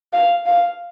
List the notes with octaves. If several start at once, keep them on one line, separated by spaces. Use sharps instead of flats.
F5
F5